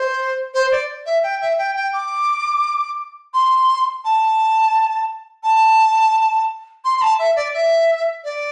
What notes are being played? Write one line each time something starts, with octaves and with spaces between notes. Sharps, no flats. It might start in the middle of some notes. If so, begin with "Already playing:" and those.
Already playing: C5
C5
D5
E5
G5
E5
G5
G5
D6
C6
A5
A5
C6
C6
A5
E5
D5
E5
D5